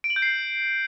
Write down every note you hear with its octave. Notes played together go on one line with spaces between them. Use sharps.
D7
F#7
G6
C7